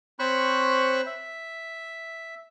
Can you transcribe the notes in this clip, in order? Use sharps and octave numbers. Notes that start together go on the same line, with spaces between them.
C4 C5 C#5 B5 C#6 F#6
E5